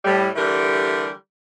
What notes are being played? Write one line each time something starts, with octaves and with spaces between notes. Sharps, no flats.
A2 G3
D3 E3 G3 A3 G4 A#4